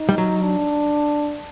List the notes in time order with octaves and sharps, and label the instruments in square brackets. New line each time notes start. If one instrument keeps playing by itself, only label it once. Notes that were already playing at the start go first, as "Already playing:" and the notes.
Already playing: [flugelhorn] D#4
[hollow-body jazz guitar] G3
F#3
[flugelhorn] D4